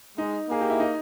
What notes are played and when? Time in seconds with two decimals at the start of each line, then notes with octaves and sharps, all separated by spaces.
0.18 G#3 D#4
0.49 A#3 G#4
0.61 G4
0.70 E4
0.80 D#4